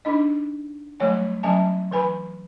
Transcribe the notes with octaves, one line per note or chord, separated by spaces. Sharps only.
D4 D#4 D#5
F#3 G3 A3 C#5 G#5
F#3 C#4 E5 G#5 A5
E3 B4 G#5 B5